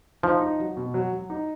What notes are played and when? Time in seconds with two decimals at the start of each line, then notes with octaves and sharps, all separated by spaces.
0.23 F3 D#4
0.41 D#4
0.60 F#3
0.77 B2
0.94 F#3
1.13 F#3
1.30 D#4